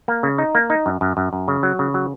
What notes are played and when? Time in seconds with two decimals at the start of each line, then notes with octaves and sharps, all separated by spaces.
0.08 A#3
0.23 C#3
0.38 D#4
0.55 A#3
0.70 D#4
0.86 F#2
1.01 F#2
1.17 F#2
1.33 F#2
1.48 C#3
1.63 F#3
1.79 C#3
1.94 F#3